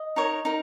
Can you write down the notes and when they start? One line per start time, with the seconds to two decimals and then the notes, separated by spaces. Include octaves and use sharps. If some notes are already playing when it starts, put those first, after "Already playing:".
Already playing: D#5
0.16 D#4 A#4 C#5
0.45 D#4 A#4